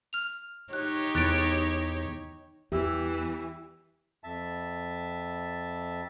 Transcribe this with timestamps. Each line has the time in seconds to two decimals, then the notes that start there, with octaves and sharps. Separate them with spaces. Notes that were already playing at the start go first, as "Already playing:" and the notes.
0.13 F6 F7
0.73 D#4 G4 C#5 F#6
1.15 E2 F#6 A6 D7
2.72 E2 E3 G4 E5 E6
4.24 F2 E5 A5